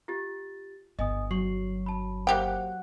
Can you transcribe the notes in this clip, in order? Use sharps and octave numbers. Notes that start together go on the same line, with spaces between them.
F4 G4 A6
G1 D#5 G#5 D#6
F#3 C#6 C7 F#7
A5 B5
A#3 G4 C5 F#5 G5